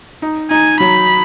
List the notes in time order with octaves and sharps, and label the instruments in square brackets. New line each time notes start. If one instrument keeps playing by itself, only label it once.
[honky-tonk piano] D#4
[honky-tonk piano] D#4 [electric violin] G#5
[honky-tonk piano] F#3 [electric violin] B5